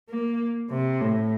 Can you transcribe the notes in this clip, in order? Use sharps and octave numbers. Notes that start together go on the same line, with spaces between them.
A#3
C3
A2